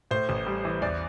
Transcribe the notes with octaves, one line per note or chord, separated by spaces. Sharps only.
A2 C5
A1
G3
E3
E2 D5